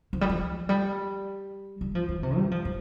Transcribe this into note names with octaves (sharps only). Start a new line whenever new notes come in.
F3
G3
F3
G3
G3
F3
E3
C3
G3
F3
F3